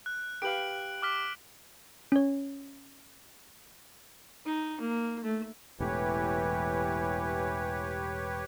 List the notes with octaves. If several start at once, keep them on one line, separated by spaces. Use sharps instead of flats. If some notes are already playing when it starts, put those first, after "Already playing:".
F#6
G4 B4 F5 D7 F#7
D6 F6 B6
C#4 C#5
D#4
A#3
A3
E1 A2 E3 G4 B4 C#5